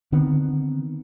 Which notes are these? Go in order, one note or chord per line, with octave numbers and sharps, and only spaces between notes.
D3 D#3 B3 C4